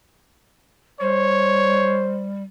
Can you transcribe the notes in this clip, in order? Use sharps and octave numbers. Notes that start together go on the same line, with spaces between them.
G3 C5 C#5